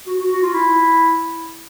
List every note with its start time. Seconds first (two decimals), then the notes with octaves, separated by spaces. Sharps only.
0.07 F#4
0.19 F#4
0.31 F#4
0.42 F4
0.53 E4